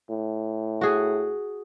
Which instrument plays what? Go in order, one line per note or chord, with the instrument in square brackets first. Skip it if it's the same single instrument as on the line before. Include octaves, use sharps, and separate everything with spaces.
[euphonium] A2
[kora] F#4 G#4